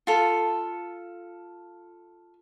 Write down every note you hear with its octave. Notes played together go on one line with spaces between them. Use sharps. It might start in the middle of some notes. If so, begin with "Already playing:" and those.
F4 A4